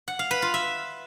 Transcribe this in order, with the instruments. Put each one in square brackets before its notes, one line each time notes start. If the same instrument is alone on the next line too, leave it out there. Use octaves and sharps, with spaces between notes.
[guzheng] F#5
F5
B4
F4
E5